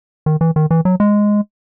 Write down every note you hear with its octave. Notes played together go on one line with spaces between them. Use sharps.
D#3
E3
D#3
E3
F#3
G#3